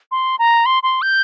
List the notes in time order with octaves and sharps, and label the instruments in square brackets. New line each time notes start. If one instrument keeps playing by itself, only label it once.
[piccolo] C6
A#5
C6
C6
G6